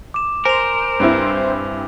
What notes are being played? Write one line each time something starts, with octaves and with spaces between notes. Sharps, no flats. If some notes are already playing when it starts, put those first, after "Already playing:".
D6 E7
A#4 C5 G#5 F7
G2 C4 E4